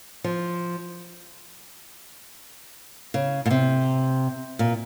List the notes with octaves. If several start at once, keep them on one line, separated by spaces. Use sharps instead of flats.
F3
C#3
A#2
C3
A#2